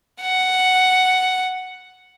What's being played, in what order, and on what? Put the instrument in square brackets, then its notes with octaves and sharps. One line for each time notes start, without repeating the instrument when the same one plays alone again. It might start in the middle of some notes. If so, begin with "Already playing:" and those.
[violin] F#5